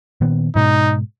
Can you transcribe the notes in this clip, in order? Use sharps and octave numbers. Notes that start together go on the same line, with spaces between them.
A#2 D#3 B3
G#2 B2 G#3 D#4